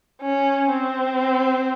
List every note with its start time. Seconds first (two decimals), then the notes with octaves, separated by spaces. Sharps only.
0.22 C#4
0.70 C4